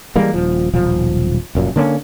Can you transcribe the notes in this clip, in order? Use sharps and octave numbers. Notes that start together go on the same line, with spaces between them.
E3 G3 G#3 A#3
D#1 F3
D#1 B1 F3
F1 F#2 A#2
D3 A#3 C#4